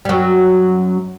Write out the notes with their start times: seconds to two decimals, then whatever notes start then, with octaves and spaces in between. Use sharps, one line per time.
0.05 G3
0.09 F#2 F#3